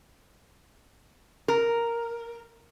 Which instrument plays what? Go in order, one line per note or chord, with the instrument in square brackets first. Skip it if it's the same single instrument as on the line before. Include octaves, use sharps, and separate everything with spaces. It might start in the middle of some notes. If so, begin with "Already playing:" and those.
[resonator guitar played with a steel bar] A#4